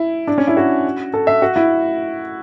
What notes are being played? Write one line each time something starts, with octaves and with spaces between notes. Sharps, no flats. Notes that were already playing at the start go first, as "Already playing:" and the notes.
Already playing: E4
D4
C#4
E4
F#4
A4
E5
F#4
E4